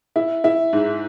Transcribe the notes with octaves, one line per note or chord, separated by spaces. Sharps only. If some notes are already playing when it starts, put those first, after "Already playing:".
E4
E4
G#2